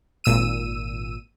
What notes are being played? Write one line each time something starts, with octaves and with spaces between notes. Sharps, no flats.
G#1 A#2 E6 D#7